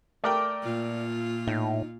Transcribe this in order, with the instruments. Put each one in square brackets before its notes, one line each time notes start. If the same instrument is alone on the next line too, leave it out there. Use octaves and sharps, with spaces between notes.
[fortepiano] A3 A#4 G5 [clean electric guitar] D5
[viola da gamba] A#2 F4
[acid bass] A2 [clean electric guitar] D#4